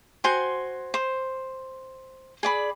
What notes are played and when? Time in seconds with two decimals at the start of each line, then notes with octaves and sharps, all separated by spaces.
0.24 F#4 C5 G#5 C6
0.94 C5
2.43 G#4 D5 B5